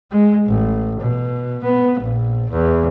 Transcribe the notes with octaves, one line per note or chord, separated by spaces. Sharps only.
G#3
A1
B2
B3
A#1
E2